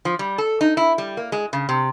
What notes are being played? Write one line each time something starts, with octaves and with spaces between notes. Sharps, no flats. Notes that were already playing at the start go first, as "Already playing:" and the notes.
F3
G3
A4
D#4
E4
G3
A#3
G#3
C#3
C3